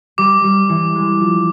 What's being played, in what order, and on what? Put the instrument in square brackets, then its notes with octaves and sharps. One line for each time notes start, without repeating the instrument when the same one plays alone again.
[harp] G3 [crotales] D6
[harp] G3
E3
G#3
F3